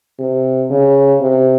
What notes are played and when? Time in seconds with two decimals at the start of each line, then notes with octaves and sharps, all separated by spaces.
0.20 C3
0.70 C#3
1.21 C3